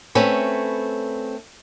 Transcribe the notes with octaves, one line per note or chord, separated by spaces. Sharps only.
A3 C4 C#4 A4 B4